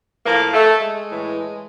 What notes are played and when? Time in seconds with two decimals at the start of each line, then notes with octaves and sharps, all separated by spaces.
0.25 A2 F3 A#3
0.53 A3
0.81 G#3
1.09 A2 E3